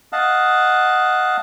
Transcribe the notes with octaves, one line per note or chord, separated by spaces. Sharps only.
D#5 F5 F#5 A5